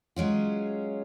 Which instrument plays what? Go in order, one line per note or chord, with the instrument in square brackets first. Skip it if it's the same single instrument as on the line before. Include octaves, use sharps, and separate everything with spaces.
[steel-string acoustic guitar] F#3 G#3 C#4 F4